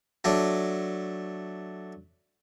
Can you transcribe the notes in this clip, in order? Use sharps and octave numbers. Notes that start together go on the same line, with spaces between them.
F#3 A3 D4